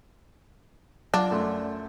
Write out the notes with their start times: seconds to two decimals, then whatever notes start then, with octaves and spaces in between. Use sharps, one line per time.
1.14 F#3 D4 F4 D5 F#5
1.31 F#2 A3 C6